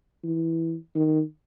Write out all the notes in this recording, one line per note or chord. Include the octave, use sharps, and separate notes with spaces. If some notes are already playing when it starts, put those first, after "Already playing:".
E3
D#3